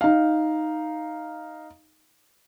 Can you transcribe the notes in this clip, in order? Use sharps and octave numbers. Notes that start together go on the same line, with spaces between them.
D#4 F5